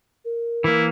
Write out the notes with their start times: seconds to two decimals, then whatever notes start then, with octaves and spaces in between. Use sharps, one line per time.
0.25 A#4
0.64 E3 A#3 E4